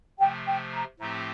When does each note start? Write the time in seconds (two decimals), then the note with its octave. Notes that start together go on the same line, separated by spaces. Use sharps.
0.20 C3 F3 A3 G5
0.46 G5
0.73 A#5
0.99 A2 F3 A3 C4 G4 A#5